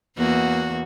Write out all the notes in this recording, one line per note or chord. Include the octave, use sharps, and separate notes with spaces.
E2 A#3 F#4